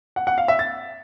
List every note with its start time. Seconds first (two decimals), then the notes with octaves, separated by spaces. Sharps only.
0.16 F#5
0.27 F#5
0.38 F5
0.48 E5
0.59 A6